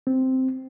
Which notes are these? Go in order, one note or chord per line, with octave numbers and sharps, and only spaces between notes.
C4